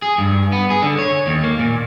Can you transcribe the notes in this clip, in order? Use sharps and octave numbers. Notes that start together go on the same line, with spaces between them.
G#4
G2
B3
G#4
D3
C#5
D#2
A#3
A#2